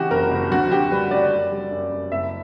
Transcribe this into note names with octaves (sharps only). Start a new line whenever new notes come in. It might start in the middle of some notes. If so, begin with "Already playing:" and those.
Already playing: C#3 E3 F#4 G4
F#1 A#4
F#1
D2 F#4
D2 G4
G3 B4
C#3 D5
F#2
G3
F#2
F#2
F#1 E5